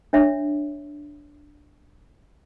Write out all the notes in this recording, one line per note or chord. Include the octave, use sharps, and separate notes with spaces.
D4 C#5 E5